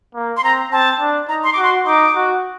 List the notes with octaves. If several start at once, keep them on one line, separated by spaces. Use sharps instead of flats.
A#3
C6
C4 A#5
C4 A5
D4
D#4 A#5
C6
F#4 D6
C6
D#4 D6
F#4